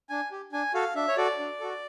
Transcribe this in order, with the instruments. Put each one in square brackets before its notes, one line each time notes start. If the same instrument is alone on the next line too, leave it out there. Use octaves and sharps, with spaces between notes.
[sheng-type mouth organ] D4 G#5
G4
D4 G#5
F#4 A4 F5
D4 E5
C#5
F#4 A4 D5
D4
F#4 A4